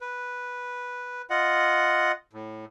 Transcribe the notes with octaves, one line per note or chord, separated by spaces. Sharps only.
B4
F4 D#5 F#5
A2